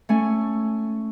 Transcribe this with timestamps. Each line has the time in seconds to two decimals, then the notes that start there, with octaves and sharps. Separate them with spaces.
0.09 A3 C#4 G#5